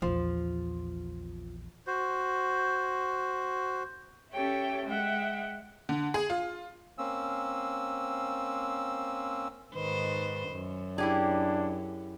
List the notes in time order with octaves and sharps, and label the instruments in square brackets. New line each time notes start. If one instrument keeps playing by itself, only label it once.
[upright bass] A#1 E2 [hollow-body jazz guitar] F3
[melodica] F#4 C5
[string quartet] C#4 G4 A4 C#5 E5 G5
G#3 E5 F#5 G5
[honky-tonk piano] D3
G#4
F4
[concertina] A#3 C4 C#4 E6
[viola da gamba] G#2 D#3 C5 [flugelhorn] B4
[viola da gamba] F#2
[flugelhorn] D4 [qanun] E4 G4 G#4